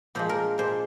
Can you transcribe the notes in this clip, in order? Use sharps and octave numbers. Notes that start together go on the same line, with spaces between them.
A#2 F3 G#3 C5
A#4
A#2 G#3 C5